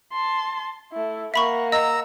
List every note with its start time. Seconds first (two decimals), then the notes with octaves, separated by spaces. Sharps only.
0.13 A5 C6
0.92 A3 E4
1.34 A#3 E5 F#5 B5 C#6
1.72 D#5 A#5 E6